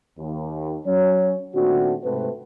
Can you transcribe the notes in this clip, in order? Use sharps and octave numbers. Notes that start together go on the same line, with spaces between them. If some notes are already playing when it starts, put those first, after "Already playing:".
D#2
F#3 C#4 C#5
A#2 D#3 A3 C4 D4 F#4
G#2 C3 A3 C4 B4